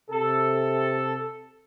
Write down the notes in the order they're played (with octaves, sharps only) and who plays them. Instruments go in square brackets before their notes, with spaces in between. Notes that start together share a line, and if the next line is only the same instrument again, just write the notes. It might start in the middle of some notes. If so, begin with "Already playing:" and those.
[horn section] C3 A4